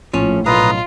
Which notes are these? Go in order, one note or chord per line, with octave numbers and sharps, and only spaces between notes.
A#1 A2 F3 C#4
B1 F4 B4 A#5 D#6